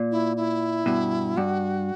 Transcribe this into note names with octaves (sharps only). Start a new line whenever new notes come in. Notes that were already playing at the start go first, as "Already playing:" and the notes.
Already playing: A#2
E4
E4
G2 B2
G2 F#4